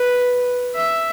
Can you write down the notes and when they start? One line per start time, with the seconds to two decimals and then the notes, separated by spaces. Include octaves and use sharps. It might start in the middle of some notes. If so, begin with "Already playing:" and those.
Already playing: B4
0.75 E5